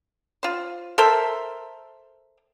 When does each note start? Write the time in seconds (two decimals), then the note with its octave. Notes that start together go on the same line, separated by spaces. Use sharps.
0.43 F4 C5
0.98 A4 A#4 C5 E5